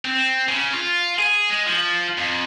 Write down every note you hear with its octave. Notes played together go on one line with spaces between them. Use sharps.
C4
C#3
F4
G#4
G#3
F3
F2